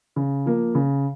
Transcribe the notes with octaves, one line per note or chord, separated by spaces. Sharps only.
C#3
F3 A#3
C#3